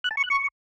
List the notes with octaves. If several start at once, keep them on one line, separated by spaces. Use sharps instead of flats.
F#6
A5
C#6
F#6
C#6